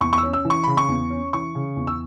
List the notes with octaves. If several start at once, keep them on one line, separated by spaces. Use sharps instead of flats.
E2 C#6
C#6
E6
C#4
E6
E3
C#6
C#3 B5
C#6
E2
C#4
E3 C#6
C#3
E2
E6